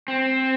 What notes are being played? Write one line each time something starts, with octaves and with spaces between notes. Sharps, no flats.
C4